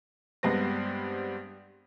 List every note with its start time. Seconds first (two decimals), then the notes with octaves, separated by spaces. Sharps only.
0.43 G2 G#3 B3 C4 A#6